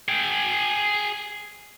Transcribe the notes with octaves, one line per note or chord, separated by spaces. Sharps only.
G#4 G5